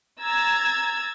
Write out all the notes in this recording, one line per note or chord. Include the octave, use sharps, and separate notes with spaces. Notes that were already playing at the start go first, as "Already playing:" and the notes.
A#5 E6 G#6 A6